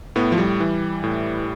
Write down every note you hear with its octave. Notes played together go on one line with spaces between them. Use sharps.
A2 B3
F3
G3
E3
A2